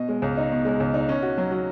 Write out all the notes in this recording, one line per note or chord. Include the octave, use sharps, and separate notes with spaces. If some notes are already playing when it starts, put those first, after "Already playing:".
Already playing: B2 D#5
G#3
C#2
D#4
B2
G#3
C#2
D#4
C#4
F#4
F#3
F#3